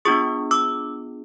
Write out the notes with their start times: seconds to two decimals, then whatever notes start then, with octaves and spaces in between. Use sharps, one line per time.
0.05 B3 D4 F4 G#4 C#6 D#6
0.51 D6 E6